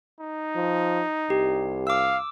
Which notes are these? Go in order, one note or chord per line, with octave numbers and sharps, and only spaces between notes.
D#4
F3
C2 G4
F5 D6 E6